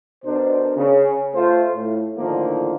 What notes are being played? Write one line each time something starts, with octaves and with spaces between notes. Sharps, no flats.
B2 D4 A#4 C5
C#3
A3 F4 C5
A2
A2 D3 D#3 F3 A#3